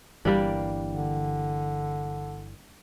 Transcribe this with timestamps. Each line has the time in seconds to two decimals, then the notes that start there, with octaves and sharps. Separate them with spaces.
0.25 G1 E3 G3 A#3 D4
0.89 D3